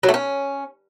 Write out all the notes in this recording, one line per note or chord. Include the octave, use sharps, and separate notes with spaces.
F#3
A3
C#4